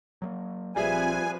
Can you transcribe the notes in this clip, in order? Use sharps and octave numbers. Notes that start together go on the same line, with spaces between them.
F#3 G3 A#3
A#1 F3 G3 C4 G#4 B4 E5 G#5